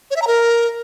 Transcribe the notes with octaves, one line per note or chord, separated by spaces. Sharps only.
C#5
E5
A#5
A#4